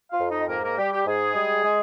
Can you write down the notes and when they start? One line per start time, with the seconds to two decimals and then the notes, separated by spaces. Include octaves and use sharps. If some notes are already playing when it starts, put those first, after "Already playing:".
0.11 F4 F5
0.20 F2
0.30 D#4 D#5
0.49 G#2 A#3 A#4
0.63 A#3 A#4
0.78 G3 G4
0.92 G4
1.06 G#2 G#3 G#4
1.35 G3
1.64 G#3